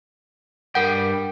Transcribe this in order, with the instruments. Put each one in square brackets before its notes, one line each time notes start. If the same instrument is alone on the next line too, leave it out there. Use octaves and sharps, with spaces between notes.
[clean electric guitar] G2 G3 G5 [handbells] A#4 F#5